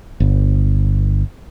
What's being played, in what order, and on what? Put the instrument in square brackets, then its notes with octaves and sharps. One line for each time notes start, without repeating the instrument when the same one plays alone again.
[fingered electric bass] G1